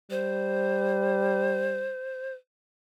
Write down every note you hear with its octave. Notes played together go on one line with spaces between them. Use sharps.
G3 C5